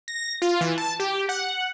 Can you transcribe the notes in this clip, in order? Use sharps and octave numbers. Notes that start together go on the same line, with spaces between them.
A#6
F4
E3
A5
G4
F#5